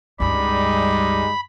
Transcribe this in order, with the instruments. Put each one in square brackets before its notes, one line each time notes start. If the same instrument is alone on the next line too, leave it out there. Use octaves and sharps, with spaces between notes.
[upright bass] C#2 G2 [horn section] G3 G#3 D#4 [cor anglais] D5 [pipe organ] B5